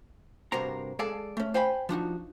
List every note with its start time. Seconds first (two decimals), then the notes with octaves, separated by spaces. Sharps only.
0.52 G2 C3 F#4 A#4 C5 A#5
0.99 G#3 G#4 A4 D5 F5 A5
1.37 A3 C#4
1.54 C5 F5 G5 G#5 B5
1.89 F3 D4 D#4 F#4